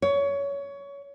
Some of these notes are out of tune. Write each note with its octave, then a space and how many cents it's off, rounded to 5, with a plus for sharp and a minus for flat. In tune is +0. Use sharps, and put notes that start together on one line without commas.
C#5 +20